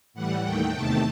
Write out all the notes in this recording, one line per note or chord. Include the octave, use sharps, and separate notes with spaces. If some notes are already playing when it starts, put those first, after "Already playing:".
A2 E3 G3 F#5
D#2 D#3 A3 G5
E2 C3 D#3 A3 A5